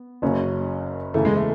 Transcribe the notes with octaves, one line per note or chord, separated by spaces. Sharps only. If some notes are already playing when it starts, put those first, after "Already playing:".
Already playing: B3
F#1 F#2 C#3 C#4
E2 C#3 E3 A3
G#3
A3